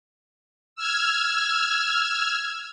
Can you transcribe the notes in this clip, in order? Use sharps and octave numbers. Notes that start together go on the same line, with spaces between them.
E6 F6 G#6